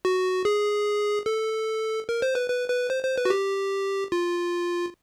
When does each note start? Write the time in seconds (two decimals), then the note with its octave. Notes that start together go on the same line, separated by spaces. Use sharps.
0.05 F#4
0.45 G#4
1.26 A4
2.09 A#4
2.22 C5
2.35 B4
2.50 B4
2.69 B4
2.90 C5
3.03 C5
3.18 B4
3.25 F#4
3.30 G4
4.12 F4